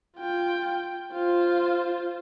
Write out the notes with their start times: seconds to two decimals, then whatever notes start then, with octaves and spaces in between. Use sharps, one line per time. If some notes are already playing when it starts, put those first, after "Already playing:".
0.17 F4 G5
1.12 F4 C5